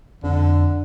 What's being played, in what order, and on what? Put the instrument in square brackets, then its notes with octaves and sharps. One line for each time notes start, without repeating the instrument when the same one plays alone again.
[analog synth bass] F2 [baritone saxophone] D3